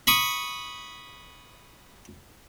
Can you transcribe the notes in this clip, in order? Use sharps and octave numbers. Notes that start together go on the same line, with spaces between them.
B5 C#6 D#6